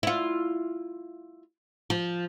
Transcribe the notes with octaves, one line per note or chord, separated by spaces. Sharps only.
E4 F4
F3